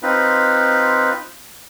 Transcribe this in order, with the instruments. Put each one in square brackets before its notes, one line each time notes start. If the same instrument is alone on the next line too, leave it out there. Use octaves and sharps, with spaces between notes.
[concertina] C4 D#4 F4 B4